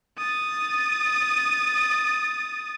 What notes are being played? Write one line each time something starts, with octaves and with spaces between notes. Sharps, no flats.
D#6 A6